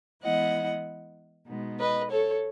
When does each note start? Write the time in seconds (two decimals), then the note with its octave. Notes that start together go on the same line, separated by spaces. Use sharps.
0.22 E3 G#3 B3 E4 D#5 F#5
1.47 B2 G#3 B3 D#4
1.78 B4 D#5
2.10 A4 C#5